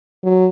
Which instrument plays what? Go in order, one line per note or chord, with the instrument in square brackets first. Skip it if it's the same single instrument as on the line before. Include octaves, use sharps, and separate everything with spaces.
[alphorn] F#3